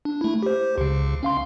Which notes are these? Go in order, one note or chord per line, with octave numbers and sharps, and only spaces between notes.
D4
A3 E4
G4 C5
C#2 C#3
C#4 F5 C6